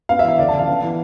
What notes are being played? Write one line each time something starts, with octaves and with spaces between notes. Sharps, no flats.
B3 F5
E5
E3 F5
D2 D5
A5
F3
F5
B3
E3